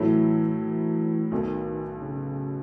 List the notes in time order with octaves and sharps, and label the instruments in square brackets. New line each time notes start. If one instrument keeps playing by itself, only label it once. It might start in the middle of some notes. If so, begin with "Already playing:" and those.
Already playing: [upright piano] A2 F#3 A3 E4 [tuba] E3
[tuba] E3
[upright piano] B1 B2 A3 [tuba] D#3
[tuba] C#3